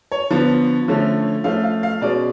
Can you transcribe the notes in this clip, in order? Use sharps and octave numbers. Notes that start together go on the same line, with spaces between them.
C#5
D3 F3 B3
D3 F3 A3 C#4
F3 A3 C#4 F5
F5
F5
B2 G#3 C#4 D5